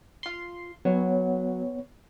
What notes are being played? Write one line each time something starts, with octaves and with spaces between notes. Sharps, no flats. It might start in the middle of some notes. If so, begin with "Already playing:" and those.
F4 C6
F#3 B3 C#5